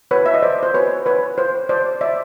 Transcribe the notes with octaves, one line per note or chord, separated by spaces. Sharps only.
B4 C#5
E5
D#5
C5 D5
C5
B4 C#5
B4 C#5
C5
C5 D5
D5 E5